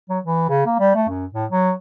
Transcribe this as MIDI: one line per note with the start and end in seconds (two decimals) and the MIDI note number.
0.10 0.19 54
0.25 0.47 52
0.49 0.65 49
0.66 0.76 58
0.79 0.92 55
0.95 1.08 57
1.09 1.25 42
1.34 1.46 45
1.51 1.72 54